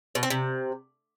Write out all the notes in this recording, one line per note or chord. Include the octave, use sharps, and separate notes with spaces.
B2
C4
C3